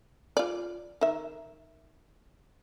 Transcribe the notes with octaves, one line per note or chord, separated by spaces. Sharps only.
F4 D5
D#3 E5